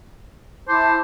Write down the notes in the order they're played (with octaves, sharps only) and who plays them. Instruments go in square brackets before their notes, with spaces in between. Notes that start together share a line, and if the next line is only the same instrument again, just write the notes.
[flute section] E4 A5 D6 [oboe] C5